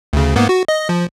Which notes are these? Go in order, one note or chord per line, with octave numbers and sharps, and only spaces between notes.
D2 C#3
G#2 A#3 B3
F#4
D#5
F3